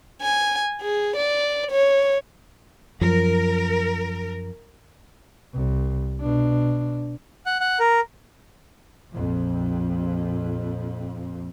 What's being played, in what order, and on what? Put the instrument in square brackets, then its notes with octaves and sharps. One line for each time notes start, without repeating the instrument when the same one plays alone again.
[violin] G#5
G#4
D5
C#5
[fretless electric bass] F#2 F3 [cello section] A#4
[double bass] C2
B2 D4
[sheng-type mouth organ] F#5
F#5
A#4
[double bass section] A#1 F2